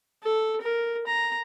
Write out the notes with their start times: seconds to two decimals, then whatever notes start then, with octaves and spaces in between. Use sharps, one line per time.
0.23 A4
0.61 A#4
1.07 A#5